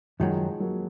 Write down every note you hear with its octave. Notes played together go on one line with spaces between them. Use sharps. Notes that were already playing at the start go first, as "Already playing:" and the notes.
F#2 D#3 F3 F#3 G#3
F#3 A#3